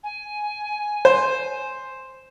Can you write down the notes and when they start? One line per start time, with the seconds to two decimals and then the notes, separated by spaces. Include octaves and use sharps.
0.04 G#5
1.05 C5